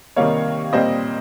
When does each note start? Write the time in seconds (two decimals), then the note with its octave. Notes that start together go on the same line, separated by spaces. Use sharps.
0.16 C3 D#3 G3 A#3 C#5 F5
0.73 A#2 G3 C4 C5 D#5